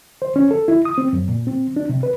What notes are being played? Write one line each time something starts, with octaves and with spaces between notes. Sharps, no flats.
C5
C#4
A4
E4
D#6
C4
F#2
A#2
C4
D4
C3
B4